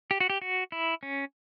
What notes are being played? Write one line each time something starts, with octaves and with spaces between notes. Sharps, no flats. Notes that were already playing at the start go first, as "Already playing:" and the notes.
G4
F#4
G4
F#4
E4
C#4